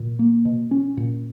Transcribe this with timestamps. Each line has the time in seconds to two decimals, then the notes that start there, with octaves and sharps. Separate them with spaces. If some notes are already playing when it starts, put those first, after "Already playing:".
Already playing: A#2
0.19 A#3
0.45 B2
0.71 C#4
0.97 A#2